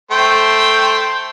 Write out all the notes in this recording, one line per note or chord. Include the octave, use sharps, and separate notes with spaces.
A3 C5 G5